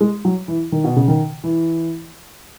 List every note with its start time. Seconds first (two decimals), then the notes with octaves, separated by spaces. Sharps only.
0.01 G#3
0.25 F#3
0.48 E3
0.72 D#3
0.84 B2
0.96 C#3
1.08 D#3
1.44 E3